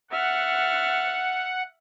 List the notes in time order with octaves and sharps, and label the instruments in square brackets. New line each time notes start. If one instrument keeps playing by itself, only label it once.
[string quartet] E5 F6 A6 [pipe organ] F#5